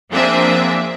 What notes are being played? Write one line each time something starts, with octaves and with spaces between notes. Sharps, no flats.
F3 A#3 C4 D4 G#4 E5